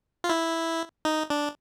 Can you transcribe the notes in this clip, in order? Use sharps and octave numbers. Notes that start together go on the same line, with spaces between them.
F4
E4
D#4
D4